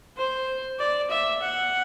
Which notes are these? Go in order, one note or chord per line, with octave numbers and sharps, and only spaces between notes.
C5
D5
E5
F#5